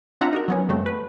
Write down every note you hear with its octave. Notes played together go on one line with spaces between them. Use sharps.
C4 D4 F4 E5 F#5 A#5
D#4 F#4 A#4
F#3 B3 C#4
F#2 C#3 G3 A3 C4
B4